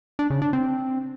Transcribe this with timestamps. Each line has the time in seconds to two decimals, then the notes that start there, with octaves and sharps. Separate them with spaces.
0.19 D4
0.30 C#3
0.42 D4
0.53 C4